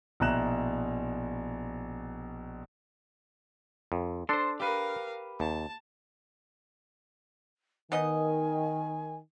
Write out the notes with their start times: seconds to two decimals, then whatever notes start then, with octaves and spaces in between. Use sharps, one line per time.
0.20 A#1 B2 E4 A#5 F#6 E7
3.92 F2
4.29 D4 A4 C5 C6
4.60 G4 A#4 B4 F5
5.40 D#2 A5
7.92 D#3 B3 D#4 D#5 G#5